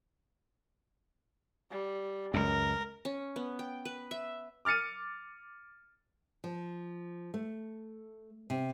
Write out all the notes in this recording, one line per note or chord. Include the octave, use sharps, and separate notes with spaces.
G3
C#2 F#2 A#4
C#4
B3
G5
B4
E5
D6 F6 A6 C#7 D#7
F3
A3
C3